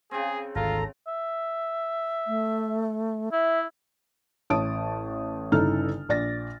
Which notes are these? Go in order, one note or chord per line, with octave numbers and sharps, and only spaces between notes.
C#3 C4 G#4
G#1 D2 F4 A4 A#5
E5
A3
E4 E5
A1 C#5 A5 D#6 D7
G1 C#3 D#4 E4 A4 F6
A#1 D5 A6 A#6